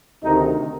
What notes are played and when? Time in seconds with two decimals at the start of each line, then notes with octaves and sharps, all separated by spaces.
0.22 D2 C3 D#3 D#4